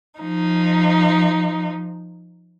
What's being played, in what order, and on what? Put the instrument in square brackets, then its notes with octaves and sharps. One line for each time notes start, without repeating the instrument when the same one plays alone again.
[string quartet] F3 D#4